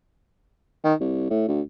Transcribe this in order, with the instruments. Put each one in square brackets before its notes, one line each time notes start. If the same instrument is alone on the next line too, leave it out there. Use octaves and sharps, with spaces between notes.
[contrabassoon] D#3
C2
A2
D2